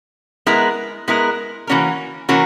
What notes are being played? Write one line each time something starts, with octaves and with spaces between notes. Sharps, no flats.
G#3 B3 E4 A#4
G#3 B3 E4 A#4
E3 A#3 C#4 F#4 A#4
E3 A#3 C#4 F#4 A#4